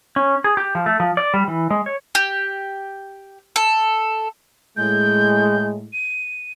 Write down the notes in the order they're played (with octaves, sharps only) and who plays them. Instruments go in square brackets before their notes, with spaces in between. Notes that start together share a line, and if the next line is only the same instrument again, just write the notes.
[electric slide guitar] C#4
G#4
G4
F3
A3
F3
D5
G3
E3
G#3
C#5
[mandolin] G4
A4
[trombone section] A2 G#3 [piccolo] G6
[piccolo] D#7